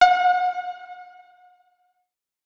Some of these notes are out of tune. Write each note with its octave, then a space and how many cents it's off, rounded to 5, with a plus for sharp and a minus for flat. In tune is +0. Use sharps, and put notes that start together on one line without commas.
F#5 -35